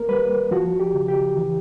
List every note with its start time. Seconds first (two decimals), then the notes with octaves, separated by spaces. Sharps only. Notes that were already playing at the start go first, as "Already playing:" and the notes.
Already playing: A#3 A#4
0.09 G3 B4
0.51 F3 F#4
0.80 G4
0.94 C#3
1.08 G4
1.37 E3